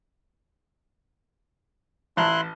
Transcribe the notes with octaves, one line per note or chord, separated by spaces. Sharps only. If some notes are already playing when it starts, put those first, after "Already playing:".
A1 E4 A5 A#5 C6 F#6